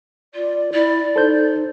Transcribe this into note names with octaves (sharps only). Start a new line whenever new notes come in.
F4 D5
E4 D5
D#4 A4 C5 G6